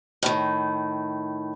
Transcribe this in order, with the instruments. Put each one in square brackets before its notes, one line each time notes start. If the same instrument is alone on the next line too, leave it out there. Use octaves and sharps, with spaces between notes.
[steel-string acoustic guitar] A2 D#3